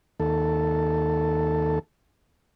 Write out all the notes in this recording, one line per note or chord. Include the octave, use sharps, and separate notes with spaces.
D#2 A4